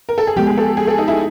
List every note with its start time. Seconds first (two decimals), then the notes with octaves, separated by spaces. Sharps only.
0.09 A#4
0.18 A4
0.27 G#4
0.36 F3 G#3 B3 G4
0.47 G#4
0.58 A4
0.77 G#4
0.87 A4
0.98 D#4
1.08 E4